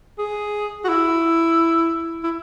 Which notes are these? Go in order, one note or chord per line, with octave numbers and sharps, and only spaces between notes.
G#4
F#4
E4
E4